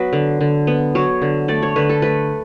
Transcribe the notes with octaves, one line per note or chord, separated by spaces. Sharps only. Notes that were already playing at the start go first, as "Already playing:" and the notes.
Already playing: F#3 B3 B4
D3
D3
B3
F#3 C#5
D3
A3 D5
C#5
D3 B4
A4
A3 B4